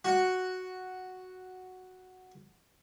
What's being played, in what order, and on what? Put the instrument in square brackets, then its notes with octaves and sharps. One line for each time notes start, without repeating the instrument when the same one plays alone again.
[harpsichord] F#4 F#5